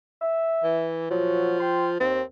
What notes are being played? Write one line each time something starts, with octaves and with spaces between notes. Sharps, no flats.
E5
E3
A#2 F3 F#3
G5 C6
D#2 C4